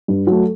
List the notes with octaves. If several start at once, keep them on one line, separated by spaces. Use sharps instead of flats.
G2
F#3 A3